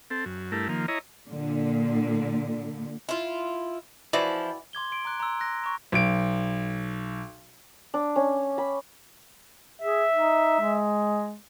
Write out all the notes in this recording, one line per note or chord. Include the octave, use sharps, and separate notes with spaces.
C4 A4
F#2
G2 A3 E4 A#4
D#3 F3 A#3
E4 C#5 D#5 A#5
A#2 D3
E4 F4
E3 F3 E4 F#4 D5
C6 D6 G#6 G7
C6 D7
A#5 D6 F#6
A#5 C6 E6
F#6 A#6
A#5 C#6
B1 D7
D4
C#4
B5
G#4 E5
D#4
G#3